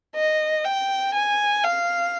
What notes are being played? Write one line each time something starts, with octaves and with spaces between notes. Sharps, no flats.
D#5
G5
G#5
F5